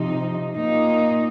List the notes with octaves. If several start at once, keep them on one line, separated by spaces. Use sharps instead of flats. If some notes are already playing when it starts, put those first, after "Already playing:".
Already playing: C3 F3 D#4
A#2 A#3 D#4